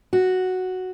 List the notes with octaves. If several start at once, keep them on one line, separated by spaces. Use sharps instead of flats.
F#4